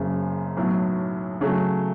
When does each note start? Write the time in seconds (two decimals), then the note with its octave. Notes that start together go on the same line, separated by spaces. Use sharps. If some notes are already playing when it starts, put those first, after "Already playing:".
Already playing: F#1 F#2 C#3
0.57 B1 A2 F#3
1.41 C#3 F#3 A3